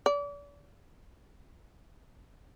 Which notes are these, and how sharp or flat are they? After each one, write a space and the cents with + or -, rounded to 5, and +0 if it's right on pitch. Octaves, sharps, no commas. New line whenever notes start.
D5 -40